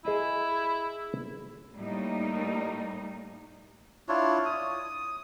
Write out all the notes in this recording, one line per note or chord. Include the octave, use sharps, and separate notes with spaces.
E4 G#4 D#5 G#5
A2 G3 A3 A#3 D#4
D4 E4 F4 C#5
D#6